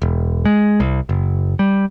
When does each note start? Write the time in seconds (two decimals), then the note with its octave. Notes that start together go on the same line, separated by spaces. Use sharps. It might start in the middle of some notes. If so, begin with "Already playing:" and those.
0.02 E1
0.45 G#3
0.80 C2
1.09 F#1
1.59 G3